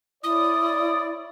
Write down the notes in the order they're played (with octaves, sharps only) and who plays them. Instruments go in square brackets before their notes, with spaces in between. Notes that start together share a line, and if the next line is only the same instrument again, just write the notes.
[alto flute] E4 [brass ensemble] C#5 D5 [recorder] D#6